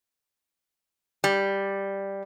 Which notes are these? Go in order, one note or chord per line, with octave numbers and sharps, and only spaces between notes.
G3